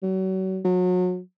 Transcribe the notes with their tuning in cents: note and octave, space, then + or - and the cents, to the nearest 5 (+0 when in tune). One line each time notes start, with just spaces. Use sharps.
F#3 +35
F#3 -30